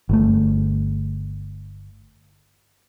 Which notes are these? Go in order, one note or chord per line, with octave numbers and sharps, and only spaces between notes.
G1 A3